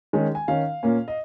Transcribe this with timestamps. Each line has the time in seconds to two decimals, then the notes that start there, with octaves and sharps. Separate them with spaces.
0.13 D#3 G#3 C#4
0.35 G#5
0.48 D#3 C#4 F5
0.83 A#2 A#3 C#4
1.08 D#5